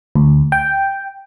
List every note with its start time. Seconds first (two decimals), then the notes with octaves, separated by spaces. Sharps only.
0.15 D2
0.52 G5